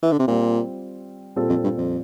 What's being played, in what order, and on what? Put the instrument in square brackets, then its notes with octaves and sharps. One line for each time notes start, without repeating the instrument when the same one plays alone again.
[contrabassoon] E3
D3
C3
[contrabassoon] A#2 [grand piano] G3 C4 F4
[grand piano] A#2 G3 C4 F4 A4
[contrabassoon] F2
G2
F2